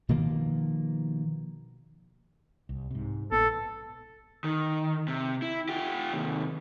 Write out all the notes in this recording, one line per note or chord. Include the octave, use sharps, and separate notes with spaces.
B2 D#3 F3 A#3
C2
G#2 C3
A#1 B3 A4
D#3
C3
E4
F4 G4
D#2 C3